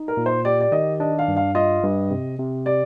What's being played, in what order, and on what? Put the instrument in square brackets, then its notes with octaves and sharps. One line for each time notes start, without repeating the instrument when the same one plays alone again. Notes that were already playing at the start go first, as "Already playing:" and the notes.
Already playing: [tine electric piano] D#4
[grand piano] A#4
[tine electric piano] A#2
[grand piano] C5
[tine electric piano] G4 [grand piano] D5
[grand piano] D5
[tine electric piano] D#3 [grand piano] D#5
[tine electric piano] D4 [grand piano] D#5
[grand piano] F5
[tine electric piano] G2
[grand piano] F5
[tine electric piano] F4 [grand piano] D#5
[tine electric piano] G2
C3
C3
[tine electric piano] G4 [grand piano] D5